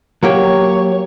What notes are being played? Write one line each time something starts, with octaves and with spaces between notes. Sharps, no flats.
F#3 A#3 G4 C#5